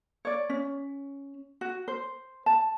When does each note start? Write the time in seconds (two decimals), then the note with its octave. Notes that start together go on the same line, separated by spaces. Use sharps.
0.25 C#5 D5
0.50 C#4
1.61 F#4
1.88 C5
2.46 A5